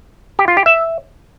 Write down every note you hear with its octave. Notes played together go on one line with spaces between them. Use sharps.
G4
F4
G4
E5